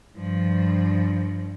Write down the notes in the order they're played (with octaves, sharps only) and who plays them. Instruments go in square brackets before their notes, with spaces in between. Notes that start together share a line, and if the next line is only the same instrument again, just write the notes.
[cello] G2 F3